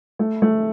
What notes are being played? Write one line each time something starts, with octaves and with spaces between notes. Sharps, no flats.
A3
A3